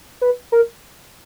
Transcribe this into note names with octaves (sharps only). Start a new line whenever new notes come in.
B4
A#4